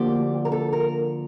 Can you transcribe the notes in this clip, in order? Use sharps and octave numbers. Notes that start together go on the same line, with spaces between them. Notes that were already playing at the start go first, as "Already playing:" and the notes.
Already playing: D2 D3 F3 A#3 G4
A#4
A4
A#4